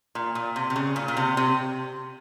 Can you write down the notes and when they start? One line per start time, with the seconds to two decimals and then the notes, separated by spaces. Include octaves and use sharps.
0.15 A#2
0.35 A#2
0.56 C3
0.70 C3
0.76 C#3
0.96 A#2
1.08 A#2
1.17 C3
1.37 C3